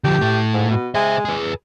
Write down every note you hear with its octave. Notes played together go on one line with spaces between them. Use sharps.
D3 F3 G4
A2 A3
G#2
B2
G#3 C5 E5
G#4 B4